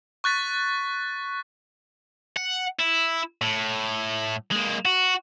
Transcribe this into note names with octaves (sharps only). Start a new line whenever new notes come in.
C#6 F#6 A6 B6
F#5
E4
A2
G#3 A#3
F#4